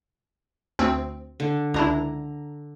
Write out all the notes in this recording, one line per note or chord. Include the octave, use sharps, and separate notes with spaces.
D2 C4
D3
C#2 D4 E4 A#5